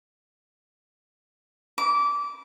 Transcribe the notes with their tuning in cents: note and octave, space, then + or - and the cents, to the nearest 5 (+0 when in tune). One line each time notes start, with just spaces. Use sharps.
D6 -20